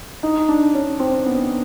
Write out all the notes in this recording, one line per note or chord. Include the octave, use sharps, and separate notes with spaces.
D#4
D4
C#4
C4
B3